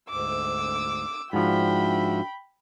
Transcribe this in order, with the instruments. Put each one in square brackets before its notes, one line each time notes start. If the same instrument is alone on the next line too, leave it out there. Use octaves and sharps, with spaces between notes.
[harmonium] D2 G#2 [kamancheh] D6 E6
[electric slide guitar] G#2 F3 [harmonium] D4 F#4 E5 [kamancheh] G5 B5